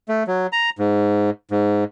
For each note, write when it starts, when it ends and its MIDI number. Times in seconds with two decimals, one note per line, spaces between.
0.08 0.23 57
0.27 0.47 54
0.52 0.70 82
0.79 1.30 44
1.51 1.84 44